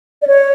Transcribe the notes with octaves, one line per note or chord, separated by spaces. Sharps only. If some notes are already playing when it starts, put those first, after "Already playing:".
D5
C#5